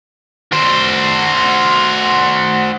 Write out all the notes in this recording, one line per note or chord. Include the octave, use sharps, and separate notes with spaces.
F#4 C5